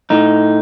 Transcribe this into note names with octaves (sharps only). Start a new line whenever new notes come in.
A2 D#4